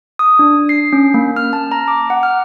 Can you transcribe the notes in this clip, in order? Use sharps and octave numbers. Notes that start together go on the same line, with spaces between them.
D#6
D4
C7
C#4
A#3
F6
A5
A#5
D6
F#5
F6